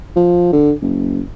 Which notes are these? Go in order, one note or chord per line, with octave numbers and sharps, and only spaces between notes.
F3
D3
F#1